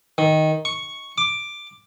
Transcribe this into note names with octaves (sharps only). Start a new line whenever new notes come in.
D#3
C#6
D6